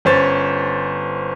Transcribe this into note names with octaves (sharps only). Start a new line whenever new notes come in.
G1 C#4 C5 A6